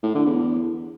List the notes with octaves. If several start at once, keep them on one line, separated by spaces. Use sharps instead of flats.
A2
D3
E2